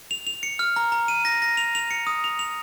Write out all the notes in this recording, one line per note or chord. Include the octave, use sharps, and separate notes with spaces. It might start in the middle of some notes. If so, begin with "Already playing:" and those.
F7
F7
C#7
F6
A#5
A#5
D#7
A#6
A#6
F7
F7
C#7
D#6
F7
F7